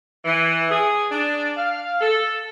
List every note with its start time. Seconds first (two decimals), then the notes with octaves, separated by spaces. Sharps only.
0.25 E3
0.70 G#4
1.10 D4
1.57 F5
2.00 A4